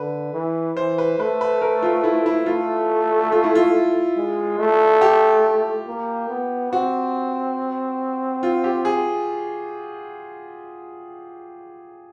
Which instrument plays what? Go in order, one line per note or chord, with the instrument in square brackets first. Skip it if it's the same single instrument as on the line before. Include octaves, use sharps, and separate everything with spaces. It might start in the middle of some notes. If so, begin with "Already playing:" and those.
Already playing: [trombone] D3 [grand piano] B4
[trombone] E3
[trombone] E3 [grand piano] C5
[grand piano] B4
[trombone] A3 [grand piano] B4
[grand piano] B4
A#4
F4
E4
E4
[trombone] A3 [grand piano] F4
[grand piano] F4
E4
F4
[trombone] G#3
A3
[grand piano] G4
[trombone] A#3
B3
[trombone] C4 [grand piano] F#4
[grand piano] F4
G4
G#4